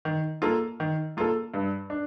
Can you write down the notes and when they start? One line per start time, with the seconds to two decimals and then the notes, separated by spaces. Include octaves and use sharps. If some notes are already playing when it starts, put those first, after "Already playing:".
0.05 D#3
0.42 A#3 F4 A4
0.80 D#3
1.17 A#3 F4 A4
1.54 G2
1.90 D4